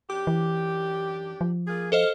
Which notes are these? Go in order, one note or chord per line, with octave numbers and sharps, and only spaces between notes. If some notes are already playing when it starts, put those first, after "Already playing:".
F#2 D4 G4 D6
E3
F3
A#3 F4 G#4
A4 C5 D#5 F5